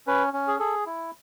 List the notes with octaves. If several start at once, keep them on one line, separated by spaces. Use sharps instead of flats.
C#4 B4
C#4
G#4
G#4 A4
E4